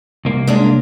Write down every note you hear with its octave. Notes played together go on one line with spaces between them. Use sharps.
C2 A#3
G#3 C#4 D4